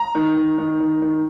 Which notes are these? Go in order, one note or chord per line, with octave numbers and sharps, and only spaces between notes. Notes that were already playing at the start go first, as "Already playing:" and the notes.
Already playing: A#5
D#3
D#3
D#3
D#3
D#3